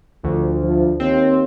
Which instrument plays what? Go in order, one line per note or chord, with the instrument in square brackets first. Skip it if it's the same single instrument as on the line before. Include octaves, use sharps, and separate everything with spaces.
[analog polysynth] D2 [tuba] F3
[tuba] F3
[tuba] D#2 [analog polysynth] C4